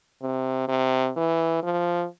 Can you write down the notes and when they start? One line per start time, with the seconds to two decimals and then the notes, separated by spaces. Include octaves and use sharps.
0.22 C3
0.68 C3
1.17 E3
1.63 F3